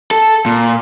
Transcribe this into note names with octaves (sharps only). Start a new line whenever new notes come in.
A4
A#2